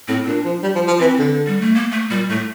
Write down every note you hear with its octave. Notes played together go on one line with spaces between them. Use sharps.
A2 C4
A#2 D4
F3
G3
F3
F3
E3 C4
D3
G3
A3
A#3
A3
A#2 G3
A2 A3